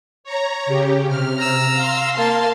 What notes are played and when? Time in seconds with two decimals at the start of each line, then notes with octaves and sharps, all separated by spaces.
0.24 C#5 A#5
0.66 C#3 G4
1.07 C3 F6
1.39 A#5 E6
1.73 F5 C6
2.17 A#3 A5